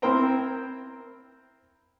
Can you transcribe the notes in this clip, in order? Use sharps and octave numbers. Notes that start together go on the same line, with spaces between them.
C4 E4 A#4 C5 G5 A#5